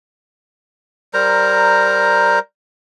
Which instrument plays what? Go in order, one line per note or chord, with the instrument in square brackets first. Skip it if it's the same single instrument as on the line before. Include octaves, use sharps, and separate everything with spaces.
[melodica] G3 A#4 C5 A#5